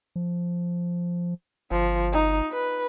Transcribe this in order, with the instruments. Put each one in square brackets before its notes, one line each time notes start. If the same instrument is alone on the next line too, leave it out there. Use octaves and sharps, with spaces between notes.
[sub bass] F3
[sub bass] G1 [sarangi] F3
[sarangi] D#4
B4